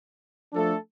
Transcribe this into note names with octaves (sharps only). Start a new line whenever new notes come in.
F3 A3 D4 A4